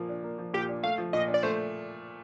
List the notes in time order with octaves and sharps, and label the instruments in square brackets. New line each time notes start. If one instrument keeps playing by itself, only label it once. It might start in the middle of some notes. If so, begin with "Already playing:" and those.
Already playing: [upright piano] A#2 F3 A#3
D4
A#3
F3
[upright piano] A#2 [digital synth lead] G4
[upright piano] D4
[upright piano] A3 [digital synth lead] F5
[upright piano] F3
[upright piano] A#2 [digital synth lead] D#5
[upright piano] D4
[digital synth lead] D5
[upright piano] A3 [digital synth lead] C5